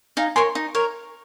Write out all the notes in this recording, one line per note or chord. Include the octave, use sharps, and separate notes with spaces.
D#4 F5 G#5
A#4 C#5 G#5 C6
D#4
A#4 C#5